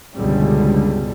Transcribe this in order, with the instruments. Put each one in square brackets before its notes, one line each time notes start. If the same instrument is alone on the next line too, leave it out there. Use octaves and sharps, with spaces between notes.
[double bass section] G1 C#2 B2 D3 G3